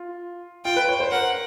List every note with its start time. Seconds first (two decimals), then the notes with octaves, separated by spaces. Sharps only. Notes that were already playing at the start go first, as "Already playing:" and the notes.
Already playing: F4
0.65 F4 G5
0.76 B4
0.88 C#5
1.00 C5
1.11 A#4 F#5